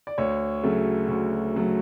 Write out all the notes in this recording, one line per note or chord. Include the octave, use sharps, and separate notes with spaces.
D5
D2 C#5
C#3 F#3 A3
D2
C#3 F#3 A3